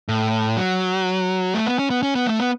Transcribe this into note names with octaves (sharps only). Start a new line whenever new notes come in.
A2
F#3
A3
B3
C#4
B3
C#4
B3
A3
B3